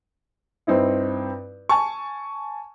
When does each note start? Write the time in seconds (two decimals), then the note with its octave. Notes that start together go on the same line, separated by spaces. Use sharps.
0.67 G2 C4 D#4 E4
1.69 G#5 A5 C#6